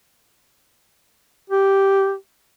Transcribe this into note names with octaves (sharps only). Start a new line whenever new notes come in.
G4